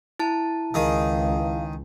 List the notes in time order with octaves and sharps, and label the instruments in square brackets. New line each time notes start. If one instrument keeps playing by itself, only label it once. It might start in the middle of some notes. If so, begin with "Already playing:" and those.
[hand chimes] E4 A5
[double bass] C#2 [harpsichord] D#3 G#4 [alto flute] F5